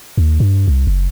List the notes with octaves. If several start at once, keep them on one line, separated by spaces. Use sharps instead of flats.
D#2
G2
C2
F#1